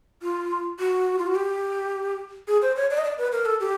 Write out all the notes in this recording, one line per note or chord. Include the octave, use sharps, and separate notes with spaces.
F4
F#4
F4
F#4
G4
G#4
C5
C#5
D5
D#5
D5
B4
A#4
A4
G4